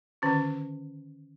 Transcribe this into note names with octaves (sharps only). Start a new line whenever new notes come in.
D3 D#3 C#4 F#4